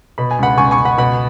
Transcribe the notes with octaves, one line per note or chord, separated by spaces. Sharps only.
B2 B5
G#5
C#2 F#5 B5
C#2 G#5 C#6
G#5 C#6
C#2
F#5 B5
B2 F#5 B5